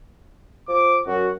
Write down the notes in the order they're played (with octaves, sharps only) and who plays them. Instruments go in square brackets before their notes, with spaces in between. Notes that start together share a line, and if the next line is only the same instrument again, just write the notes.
[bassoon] F3 [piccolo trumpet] D6
[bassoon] F#2 [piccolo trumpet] F#4